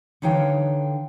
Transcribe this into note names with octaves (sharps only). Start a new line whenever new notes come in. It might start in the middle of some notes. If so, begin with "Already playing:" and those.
D3 E3 D#4 C#5 F5 G5